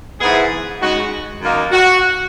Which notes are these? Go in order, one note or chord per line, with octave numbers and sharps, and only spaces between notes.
G#2 E3 B3 G#4
C#3 G#3 D#4 F#4
F#2 D#3 A#3 D#4
F#4